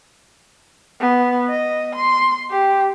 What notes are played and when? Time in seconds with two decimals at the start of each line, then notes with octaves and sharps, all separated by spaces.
1.00 B3
1.50 D#5
1.95 C6
2.51 G4